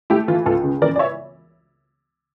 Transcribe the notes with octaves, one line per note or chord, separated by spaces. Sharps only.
A3 E4 G4
E3 F4
C#2 F4 A4
C#3
E3 A#4 D5
D5
C#5 E5